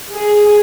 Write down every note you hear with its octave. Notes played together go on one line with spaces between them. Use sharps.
G#4